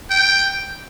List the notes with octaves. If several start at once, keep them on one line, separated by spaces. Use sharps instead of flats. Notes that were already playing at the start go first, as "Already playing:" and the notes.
G5